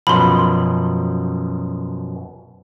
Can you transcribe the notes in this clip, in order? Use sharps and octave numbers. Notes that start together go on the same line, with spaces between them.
F#2 B2 F3 B5 C6